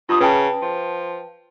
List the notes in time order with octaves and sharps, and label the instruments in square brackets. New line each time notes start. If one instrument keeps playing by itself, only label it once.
[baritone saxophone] G2 [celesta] F4 D#6
[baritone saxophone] C#3 [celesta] B4 G5 A5
[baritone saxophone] F3